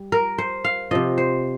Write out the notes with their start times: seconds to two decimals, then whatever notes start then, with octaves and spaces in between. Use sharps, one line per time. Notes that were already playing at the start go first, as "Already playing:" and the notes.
Already playing: G3
0.12 A#4
0.38 C5
0.64 F5
0.91 C3 F3 D#5
1.18 C5